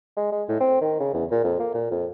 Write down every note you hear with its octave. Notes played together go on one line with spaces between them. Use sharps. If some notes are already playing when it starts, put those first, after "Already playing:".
G#3
G#3
A2
C4
D#3
C#3
E2
A#2
F2
A#3
A#2
F2